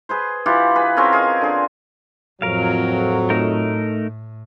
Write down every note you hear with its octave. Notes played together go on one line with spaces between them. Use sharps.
G#4 B4 C5
E3 F4 G4 F#5
G#4 B4
C4 C#4 G#4 A#4
G#4 A#4 D#5
D3 G#4
F2 A2 F#3 A#4 F5
A3 D#4 A#4